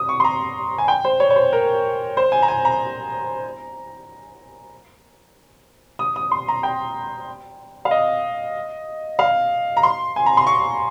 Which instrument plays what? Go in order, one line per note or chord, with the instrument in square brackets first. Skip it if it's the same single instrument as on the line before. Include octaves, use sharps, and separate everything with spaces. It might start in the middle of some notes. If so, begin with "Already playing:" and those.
Already playing: [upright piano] D#6
C#6
C6
A#5
G#5
G5
C5
C#5
C#5
C5
A#4
C5
G#5
A#5
G#5
A#5
D#6
D#6
C6
A#5
G5
F5
D#5
F5
A#5
C6
G#5
A#5
C6
C#6